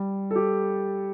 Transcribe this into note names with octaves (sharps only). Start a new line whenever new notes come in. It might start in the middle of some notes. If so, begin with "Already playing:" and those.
Already playing: G3
A4
G4